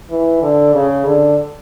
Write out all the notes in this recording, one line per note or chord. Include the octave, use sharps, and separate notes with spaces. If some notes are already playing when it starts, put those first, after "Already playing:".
E3
D3
C#3
D3